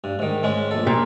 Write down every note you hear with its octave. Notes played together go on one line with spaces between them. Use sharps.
G2
G#2 D#3
G#2 G#3 C#4
A#1 A4
A#2